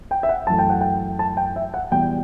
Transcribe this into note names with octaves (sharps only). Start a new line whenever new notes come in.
G5
E5
F#5
F#2 E3 A3 A5
G5
F#5
G5
A5
G5
E5
F#5
E2 B2 G3 B3 G5